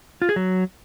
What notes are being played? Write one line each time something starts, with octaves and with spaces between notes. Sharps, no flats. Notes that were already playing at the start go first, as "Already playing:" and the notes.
F4
G#4
F#3